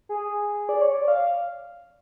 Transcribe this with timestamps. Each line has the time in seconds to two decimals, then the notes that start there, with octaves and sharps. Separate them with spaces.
0.09 G#4
0.69 D5
0.81 C#5
0.94 D5
1.08 F5